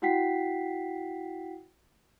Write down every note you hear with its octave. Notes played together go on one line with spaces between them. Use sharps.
E4 F#4 F#5 G5 B6 C7